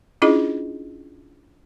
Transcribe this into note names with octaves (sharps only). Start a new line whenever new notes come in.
C#4 D4 E4 F4 G#4 D#5